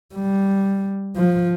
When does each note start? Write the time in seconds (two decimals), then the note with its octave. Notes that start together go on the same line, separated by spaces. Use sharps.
0.15 G3
1.17 F3